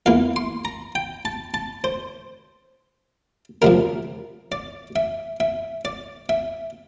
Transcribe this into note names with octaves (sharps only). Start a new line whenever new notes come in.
E2 E3 A#3 F5
C6
A#5
G5
A5
A5
C5
D2 C3 F3 A#4
D5
E5
E5
D5
E5